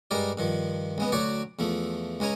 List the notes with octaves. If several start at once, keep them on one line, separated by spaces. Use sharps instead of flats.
G2 G3 G#3 A#4 D5
G2 D#3 F3
C#2 G#3 B3
D2 F#3 F#4 C#5 D5 D6
E2 F3 A3
C#2 G#3 C#4 G#5 A#5